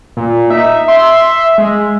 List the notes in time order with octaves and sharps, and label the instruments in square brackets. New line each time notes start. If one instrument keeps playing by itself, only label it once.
[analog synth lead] A#2
[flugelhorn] D#4 [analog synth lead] E5
[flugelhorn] E5 [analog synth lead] C6
[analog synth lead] G#3 [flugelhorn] E5